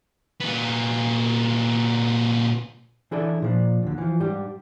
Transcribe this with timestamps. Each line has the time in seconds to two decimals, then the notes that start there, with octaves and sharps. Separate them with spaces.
0.40 A#2 B3
3.11 E3 D4 E4 G#4 A4 D5
3.42 A#2 F3 D4
3.83 D#2 D3
3.98 E3 F3
4.20 G#2 G3 D4 G4